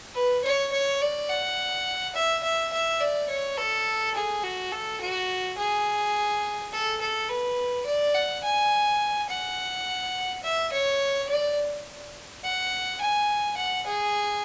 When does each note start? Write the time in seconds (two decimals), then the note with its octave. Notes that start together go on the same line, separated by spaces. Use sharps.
0.15 B4
0.44 C#5
0.72 C#5
1.01 D5
1.30 F#5
2.15 E5
2.43 E5
2.73 E5
3.00 D5
3.30 C#5
3.58 A4
4.15 G#4
4.43 F#4
4.72 A4
5.01 F#4
5.58 G#4
6.73 A4
7.01 A4
7.29 B4
7.86 D5
8.15 F#5
8.44 G#5
9.29 F#5
10.43 E5
10.73 C#5
11.29 D5
12.44 F#5
13.01 G#5
13.57 F#5
13.86 G#4